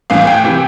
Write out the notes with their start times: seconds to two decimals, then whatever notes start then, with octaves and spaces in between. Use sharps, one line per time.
0.10 A2 E3 F5
0.21 F5
0.27 G5
0.44 C3 E3